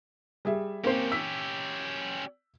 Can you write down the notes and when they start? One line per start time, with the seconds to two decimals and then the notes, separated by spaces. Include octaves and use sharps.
0.45 G3 G#4 E5
0.84 A#3 C4 C#4 G4 C5
1.12 E6 B6